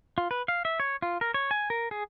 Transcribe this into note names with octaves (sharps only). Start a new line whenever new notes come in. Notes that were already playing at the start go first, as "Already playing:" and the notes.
F4
B4
F5
E5
C#5
F4
A#4
C#5
G#5
A#4
G#4